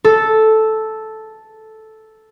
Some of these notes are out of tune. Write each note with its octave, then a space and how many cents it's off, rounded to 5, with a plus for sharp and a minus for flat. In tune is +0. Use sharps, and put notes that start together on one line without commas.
A4 -5